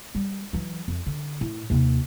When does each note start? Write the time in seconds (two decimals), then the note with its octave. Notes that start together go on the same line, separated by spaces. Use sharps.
0.15 G3
0.53 E3 F#3
0.88 F2
1.06 D3
1.41 A2
1.70 D#2 C3